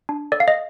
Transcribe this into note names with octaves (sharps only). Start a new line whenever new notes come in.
D4
A4 D5
F5
D#5